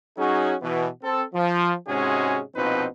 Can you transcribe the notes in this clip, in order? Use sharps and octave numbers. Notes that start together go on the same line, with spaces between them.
F#3 C#4 D#4 F#4 G#4
B2 E3
C4 A4
F3
G#2 C3 G#3 C#4 F#4 G#4
A#1 B2 F3 C4 D#4 B4